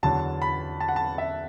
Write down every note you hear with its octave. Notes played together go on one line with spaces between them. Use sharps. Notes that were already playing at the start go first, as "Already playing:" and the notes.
E2 D3 F#3 A5
B5
A5
F#5
A5
E5